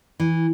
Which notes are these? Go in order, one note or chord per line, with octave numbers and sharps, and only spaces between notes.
E3